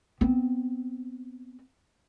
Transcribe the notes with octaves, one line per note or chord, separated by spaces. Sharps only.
B3 C4